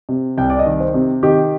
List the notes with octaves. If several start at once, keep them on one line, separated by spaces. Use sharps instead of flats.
C3
C2 G5
D5
D#5
D#3
C5
C3
D#3 G4